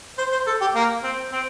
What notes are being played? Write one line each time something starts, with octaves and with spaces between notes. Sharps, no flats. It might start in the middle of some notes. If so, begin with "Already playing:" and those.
C5
C5
A4
G4
A#3
C4
C4